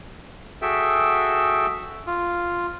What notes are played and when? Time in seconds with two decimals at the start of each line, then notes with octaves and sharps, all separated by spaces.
0.62 F#4 G#4 A4 E5 G5
2.07 F4